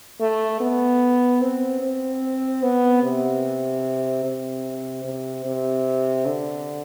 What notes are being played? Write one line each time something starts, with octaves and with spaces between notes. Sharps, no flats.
A3
B3
C4
C4
B3
C3
C3
C3
C3
D3